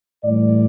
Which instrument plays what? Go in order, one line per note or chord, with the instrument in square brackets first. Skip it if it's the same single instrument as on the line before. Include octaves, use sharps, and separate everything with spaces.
[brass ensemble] A2 E3 G3 D5